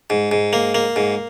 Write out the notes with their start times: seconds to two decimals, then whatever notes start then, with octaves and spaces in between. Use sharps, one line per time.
0.10 G#2
0.31 G#2
0.53 A#3
0.75 A#3
0.96 G#2